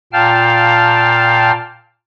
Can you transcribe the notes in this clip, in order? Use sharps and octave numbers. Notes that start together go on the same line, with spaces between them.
A#2 F5 G5 A5 F6